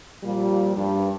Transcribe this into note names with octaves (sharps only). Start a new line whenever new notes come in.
A#2 F3 G3
G2